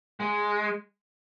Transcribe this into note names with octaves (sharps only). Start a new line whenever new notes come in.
G#3